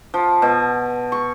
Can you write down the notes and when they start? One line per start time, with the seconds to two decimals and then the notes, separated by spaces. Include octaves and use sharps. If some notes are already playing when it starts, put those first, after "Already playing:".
0.14 F3
0.42 B2
1.12 C#6